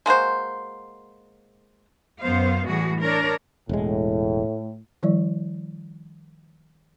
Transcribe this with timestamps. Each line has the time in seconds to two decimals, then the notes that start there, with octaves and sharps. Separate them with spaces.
0.06 G#3 A#3 F#4 C5
2.22 F#2 B3 C5 F5
2.67 A2 E3 G3 F#4 G#4
3.01 D4 A#4 C#5
3.69 E1 A2 G#3
5.03 D#3 F3 G3 E4 D5